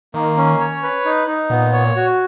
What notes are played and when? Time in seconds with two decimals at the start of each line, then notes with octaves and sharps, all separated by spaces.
0.14 D#3 A#3
0.37 C#4
0.59 C#5
0.83 B4
1.05 D#4
1.27 D#4
1.50 A#2 B3
1.73 C#5
1.96 F#4